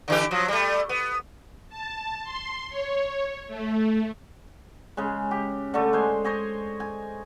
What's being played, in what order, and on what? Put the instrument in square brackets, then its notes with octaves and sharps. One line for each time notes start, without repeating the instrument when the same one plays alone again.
[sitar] D3 E3 G4
F3 F#3
G3 A3
B3
[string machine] A5
C6
C#5
A3
[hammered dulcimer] C#3 G#3
G4
D3 A3
G#3 C5 G#5
C5 C#5 D#5 G#5
G#5